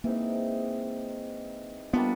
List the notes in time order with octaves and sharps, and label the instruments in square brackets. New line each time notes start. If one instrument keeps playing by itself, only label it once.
[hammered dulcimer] E3 G#3 C4 D#4 [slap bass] A#3
[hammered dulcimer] G3 A#3 D4 F4 [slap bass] B3